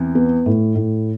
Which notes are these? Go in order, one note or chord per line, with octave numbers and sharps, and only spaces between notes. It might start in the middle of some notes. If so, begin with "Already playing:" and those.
Already playing: E2 E3 C4
B3
A2
A2